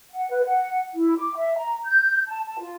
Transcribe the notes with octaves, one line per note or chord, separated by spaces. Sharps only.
F#5
B4
F#5
E4
D6
E5
A#5
G6
A5
A5
F4